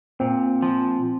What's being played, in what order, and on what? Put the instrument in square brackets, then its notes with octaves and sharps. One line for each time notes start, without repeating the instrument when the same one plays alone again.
[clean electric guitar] A#2 [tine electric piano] C4
[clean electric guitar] F3